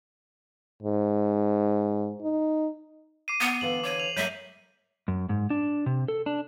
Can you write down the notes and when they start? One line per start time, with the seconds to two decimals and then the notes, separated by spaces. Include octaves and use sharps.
0.83 G#2
2.21 D#4
3.28 D6 C7 D#7
3.41 B3
3.61 D3 E3 F5 F#7
3.84 C#5 D6 D#7
4.00 F7
4.16 F#3 A3 A#4 E5 G6 D#7
5.08 F#2
5.29 G#2
5.50 D4
5.86 C3
6.08 A4
6.26 D4